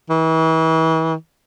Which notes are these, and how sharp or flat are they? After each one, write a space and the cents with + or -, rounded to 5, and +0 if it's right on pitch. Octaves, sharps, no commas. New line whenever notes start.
E3 -35